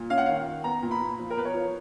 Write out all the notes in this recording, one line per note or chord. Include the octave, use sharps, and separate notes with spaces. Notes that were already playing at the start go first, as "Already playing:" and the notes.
Already playing: A#2
C#4 F5
F#5
D#3 F5
D#3
B3 A#5
A#2
B5
A#2
F3
A#4
B3 B4
C#5
F3